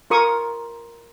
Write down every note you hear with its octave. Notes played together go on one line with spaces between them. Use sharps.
F4 A#4 C#6 D#6